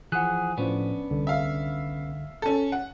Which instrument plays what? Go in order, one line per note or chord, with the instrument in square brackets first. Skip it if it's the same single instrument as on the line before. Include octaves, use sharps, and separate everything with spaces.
[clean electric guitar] E3 F3 G#4 [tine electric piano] F#5 F#6
[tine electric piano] A2 F3 [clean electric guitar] B3 C#4 D4
[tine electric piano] C2 D3
[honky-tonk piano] E5 F5
C#4 A4
F#5